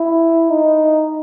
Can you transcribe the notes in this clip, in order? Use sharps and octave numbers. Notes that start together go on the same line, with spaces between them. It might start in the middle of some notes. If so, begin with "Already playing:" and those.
Already playing: E4
D#4